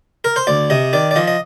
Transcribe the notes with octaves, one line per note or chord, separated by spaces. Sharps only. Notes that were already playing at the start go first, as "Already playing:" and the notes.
A#4
C5
D2 D5
C3 D#5
D#3 D5
D5
F3 D#5
D#5